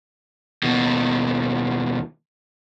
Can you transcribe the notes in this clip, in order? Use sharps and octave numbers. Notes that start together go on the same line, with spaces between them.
D#2 B2